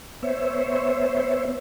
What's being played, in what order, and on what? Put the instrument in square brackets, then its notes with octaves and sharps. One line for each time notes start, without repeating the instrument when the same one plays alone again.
[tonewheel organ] B3 C5 C#5 E5